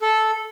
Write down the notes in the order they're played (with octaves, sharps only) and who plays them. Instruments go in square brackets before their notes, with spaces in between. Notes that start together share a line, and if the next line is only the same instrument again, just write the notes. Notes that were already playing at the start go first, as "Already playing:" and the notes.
[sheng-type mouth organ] A4